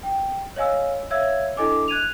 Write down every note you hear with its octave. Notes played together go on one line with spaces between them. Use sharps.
G5
C#5 D#5 F5 G#5 E6
C#5 E5 F5 E6 G#6
D4 E4 A4 D#5 G#5 D6
F#6 G#6 D#7 F7